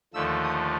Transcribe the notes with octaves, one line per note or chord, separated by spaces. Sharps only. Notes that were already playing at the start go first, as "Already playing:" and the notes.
D#2 D3 F3 A3 E6
D#6